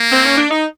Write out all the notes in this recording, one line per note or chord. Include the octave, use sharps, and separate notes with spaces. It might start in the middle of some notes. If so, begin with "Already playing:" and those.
Already playing: A#3
C4
C#4
D4
D#4